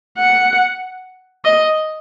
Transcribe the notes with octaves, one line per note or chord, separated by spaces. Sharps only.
F#5
D#5